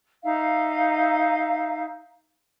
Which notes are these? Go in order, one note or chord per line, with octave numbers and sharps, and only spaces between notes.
D#4 E5 F5